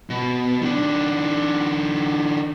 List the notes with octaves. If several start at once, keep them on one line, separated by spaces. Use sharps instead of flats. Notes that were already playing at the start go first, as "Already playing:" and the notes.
B2
D#3 D4